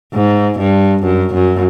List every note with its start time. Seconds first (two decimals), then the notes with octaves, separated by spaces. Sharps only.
0.14 G#2
0.59 G2
1.03 F#2
1.34 F#2